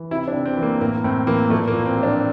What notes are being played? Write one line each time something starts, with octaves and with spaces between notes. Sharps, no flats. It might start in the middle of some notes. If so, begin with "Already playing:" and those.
Already playing: E3
C3 E4
D4
C3
C4
E3
A#3
A2 A#3
A2 C4
E3 A#3
A#2 A3
A#3
A#2
C4
F3
D4